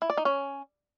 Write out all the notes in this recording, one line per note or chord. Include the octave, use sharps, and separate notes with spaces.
E4
D5
D#4
C#4